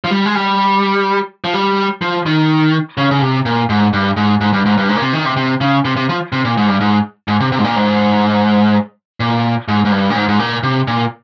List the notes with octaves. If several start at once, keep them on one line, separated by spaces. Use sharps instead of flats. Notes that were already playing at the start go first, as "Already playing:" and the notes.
F3
G3
G#3
G3
F3
G3
F3
D#3
C#3
C#3
C3
A#2
G#2
G2
G#2
G#2
G2
G#2
G2
G#2
A#2
C3
D#3
C3
C3
C#3
C3
C3
F3
C3
A#2
G#2
G2
G#2
G#2
C3
C3
G#2
A#2
G#2
A#2
G#2
G#2
G2
A#2
G#2
G#2
A#2
C3
A#2